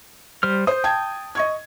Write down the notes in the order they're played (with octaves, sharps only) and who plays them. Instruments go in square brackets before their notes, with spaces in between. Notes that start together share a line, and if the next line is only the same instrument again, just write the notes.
[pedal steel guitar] G3 C5 F6
[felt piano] C5 [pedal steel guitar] D#6 G6
[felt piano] G5 A5 G#6
D#5 C#6 G#6